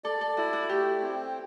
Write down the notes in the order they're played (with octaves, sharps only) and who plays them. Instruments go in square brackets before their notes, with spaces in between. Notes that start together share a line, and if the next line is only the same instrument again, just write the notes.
[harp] A4 [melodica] D5
[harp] A4
[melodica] E4 [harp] F#4
[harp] F#4
[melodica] A3 [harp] G4
[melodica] C4